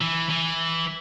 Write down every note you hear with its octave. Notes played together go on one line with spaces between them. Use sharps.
E3
E3